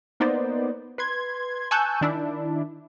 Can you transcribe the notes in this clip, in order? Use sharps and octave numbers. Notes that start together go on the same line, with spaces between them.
A#3 B3 D#4 C5 D5
B4 C6 G#6
G#5 A5 C#6 E6 F#6 G6
D#3 D4 E4